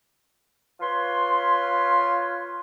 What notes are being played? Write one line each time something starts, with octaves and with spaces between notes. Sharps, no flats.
F4 B4 C#5 C6